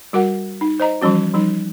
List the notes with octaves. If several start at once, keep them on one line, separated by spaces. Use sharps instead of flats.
G3 F#4 A#4 F#5
D#4
C5 D#5 A#5
E3 F3 G3 C#4 F#4
F3 G3 D#4